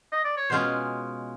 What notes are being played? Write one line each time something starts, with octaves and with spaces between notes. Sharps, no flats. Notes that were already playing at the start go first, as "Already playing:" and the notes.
D#5
D5
C#5
B2 G#3 C#4 F4 C5